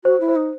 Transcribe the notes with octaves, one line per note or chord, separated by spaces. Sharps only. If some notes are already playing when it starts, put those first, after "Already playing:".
F#4 C5
E4
C5
D#4